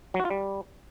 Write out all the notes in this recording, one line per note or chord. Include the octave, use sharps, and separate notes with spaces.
F#3
F#4
F4
G3